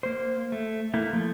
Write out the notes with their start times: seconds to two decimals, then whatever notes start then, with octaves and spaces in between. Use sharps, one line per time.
0.03 A#3 C5
0.52 A3
0.94 A3 A#3 E4
1.13 F3 A3